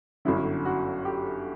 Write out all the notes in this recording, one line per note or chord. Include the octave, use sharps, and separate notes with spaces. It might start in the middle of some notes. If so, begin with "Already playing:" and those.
G1 F#2 D3 E4
F#4
G4